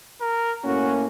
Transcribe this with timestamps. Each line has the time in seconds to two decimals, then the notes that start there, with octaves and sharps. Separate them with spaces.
0.21 A#4
0.64 A2 A#3 C#4 F#4